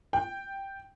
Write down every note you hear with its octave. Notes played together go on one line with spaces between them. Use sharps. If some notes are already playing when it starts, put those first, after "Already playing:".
G5